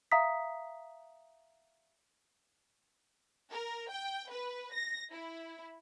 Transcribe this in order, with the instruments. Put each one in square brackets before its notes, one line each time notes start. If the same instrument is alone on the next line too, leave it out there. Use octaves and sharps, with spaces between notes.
[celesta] E5 F5 A#5 D#6 B6
[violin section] A#4
G5
B4
A#6
E4